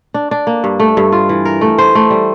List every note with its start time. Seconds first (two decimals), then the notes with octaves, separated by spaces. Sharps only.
0.14 D4
0.31 D4
0.47 A#3
0.64 G2
0.80 A3
0.97 G2
1.12 F4
1.29 E3
1.45 A#4
1.61 A3
1.78 C5
1.95 A3
2.10 G3